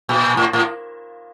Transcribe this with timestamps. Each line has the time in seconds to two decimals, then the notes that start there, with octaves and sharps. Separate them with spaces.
0.09 A#2
0.37 A2
0.53 A2